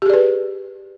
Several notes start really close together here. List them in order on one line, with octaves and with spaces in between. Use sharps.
G4 G#4 D5 B4